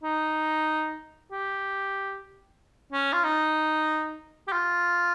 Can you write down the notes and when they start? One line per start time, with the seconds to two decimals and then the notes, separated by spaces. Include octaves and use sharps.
0.03 D#4
1.32 G4
2.92 C#4
3.13 F4
3.24 D#4
4.48 G4
4.52 F4